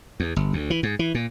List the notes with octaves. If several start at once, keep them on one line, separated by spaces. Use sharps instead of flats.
E2
G1
D2
E3
G#2
E3
A#2